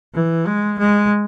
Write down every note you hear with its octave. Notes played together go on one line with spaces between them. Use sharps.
E3
G#3
G#3